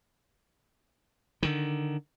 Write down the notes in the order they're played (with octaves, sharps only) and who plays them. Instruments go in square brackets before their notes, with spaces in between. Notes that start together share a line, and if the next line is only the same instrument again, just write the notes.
[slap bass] D3 D#3